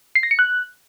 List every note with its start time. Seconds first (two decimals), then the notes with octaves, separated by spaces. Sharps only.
0.15 C7
0.23 A#6
0.31 C#7
0.39 F#6